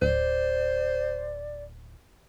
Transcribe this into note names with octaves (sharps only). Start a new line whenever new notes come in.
D1 C5 D5